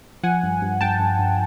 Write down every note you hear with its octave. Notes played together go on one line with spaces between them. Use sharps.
F3 F#5 G#5
G2
G2
G2 G5 A5
G2
G2